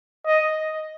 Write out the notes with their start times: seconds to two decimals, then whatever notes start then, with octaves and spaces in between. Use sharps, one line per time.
0.26 D#5